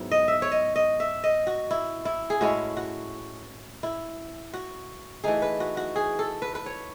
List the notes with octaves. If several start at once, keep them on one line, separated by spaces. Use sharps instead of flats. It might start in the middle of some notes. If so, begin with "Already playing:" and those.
Already playing: G#2 F#3 B3 E4
D#5
E5
C#5
D#5
D#5
E5
D#5
F#4
E4
E4
G#4
A2 G#3 C#4 E4 F#4
F#4
E4
F#4
E3 A3 D#4 G#4
B4
F#4
F#4
G#4
A4
B4
B4
C#5